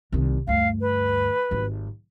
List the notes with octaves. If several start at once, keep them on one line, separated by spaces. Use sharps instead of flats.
C2 D#3
D2 G2 F5
B4
G#1 G3